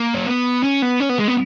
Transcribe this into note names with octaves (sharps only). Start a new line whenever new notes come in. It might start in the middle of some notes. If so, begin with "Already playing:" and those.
Already playing: A#3
C#4
B3
C#4
B3
C#4
B3
G#3
B3